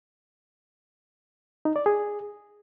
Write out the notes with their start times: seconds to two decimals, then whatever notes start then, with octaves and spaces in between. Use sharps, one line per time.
1.65 D#4
1.76 D5
1.86 G#4